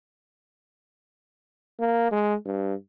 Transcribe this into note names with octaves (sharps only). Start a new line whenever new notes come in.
A#3
G#3
G2